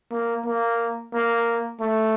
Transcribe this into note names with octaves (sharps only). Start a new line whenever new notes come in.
A#3
A#3
A#3
A3